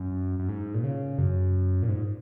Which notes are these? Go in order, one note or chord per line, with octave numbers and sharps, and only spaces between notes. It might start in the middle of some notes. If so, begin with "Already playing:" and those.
Already playing: F#2
F#2
G#2
A#2
C#3
F#2
A#2
G#2